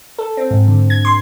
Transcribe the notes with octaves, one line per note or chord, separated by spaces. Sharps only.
A4
C4
G#2
D3
G#6
C6